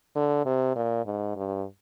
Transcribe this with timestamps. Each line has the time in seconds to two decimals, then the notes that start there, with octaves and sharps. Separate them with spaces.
0.16 D3
0.46 C3
0.76 A#2
1.06 G#2
1.36 G2